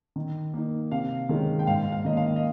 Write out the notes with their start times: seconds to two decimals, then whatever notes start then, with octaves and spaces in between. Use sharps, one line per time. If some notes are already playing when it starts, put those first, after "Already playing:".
0.16 D#3
0.54 A#3 D#4
0.91 C3 F5
1.29 D#3 G#3 C#4
1.59 G5
1.67 G#2 F5
1.92 F5
2.05 D#3 A#3 C#4 D#5
2.17 F5
2.36 D#5